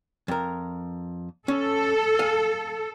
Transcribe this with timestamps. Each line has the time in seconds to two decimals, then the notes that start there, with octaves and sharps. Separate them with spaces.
0.28 F2 A#4
1.48 C#4 A4
2.19 F5 G#5